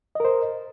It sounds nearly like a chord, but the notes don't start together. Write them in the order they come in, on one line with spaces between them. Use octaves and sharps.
D#5 A#4 C5